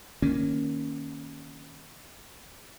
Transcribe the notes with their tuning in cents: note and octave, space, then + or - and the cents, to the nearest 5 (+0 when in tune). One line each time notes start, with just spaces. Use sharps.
D#3 +0 A#3 +0 C#4 +0